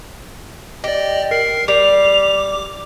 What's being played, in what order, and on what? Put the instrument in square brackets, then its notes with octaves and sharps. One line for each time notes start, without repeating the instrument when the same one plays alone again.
[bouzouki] G4 [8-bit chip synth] D5 D#5
[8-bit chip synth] A#4 [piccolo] C7
[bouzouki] G3 [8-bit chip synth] D6 [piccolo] F7